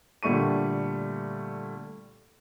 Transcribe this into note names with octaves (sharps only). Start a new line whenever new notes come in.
A#2 D3 G3 A3 C#6 D#7